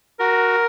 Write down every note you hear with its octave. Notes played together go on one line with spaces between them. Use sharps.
F#4 A#4